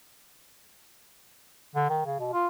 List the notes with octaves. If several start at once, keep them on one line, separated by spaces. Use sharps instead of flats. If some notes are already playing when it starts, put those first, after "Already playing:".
D3
D#3
C#3
B2
F4